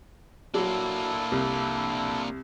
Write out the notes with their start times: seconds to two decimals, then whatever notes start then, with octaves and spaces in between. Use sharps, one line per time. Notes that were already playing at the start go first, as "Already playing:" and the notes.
0.54 F#3 A#3 D4 E4 A4
1.32 C2